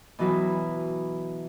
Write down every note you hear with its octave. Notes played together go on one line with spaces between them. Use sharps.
B2 E3 F#3 F#4 B4